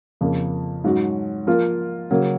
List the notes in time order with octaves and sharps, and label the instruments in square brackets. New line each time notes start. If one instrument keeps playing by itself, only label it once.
[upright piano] F2 C#3 F3 A#3
G#2 F#3 C#4 F#4
F3 A#3 F4 A#4
C#3 F#3 A#3